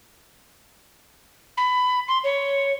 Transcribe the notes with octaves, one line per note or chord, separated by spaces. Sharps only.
B5
C6
C#5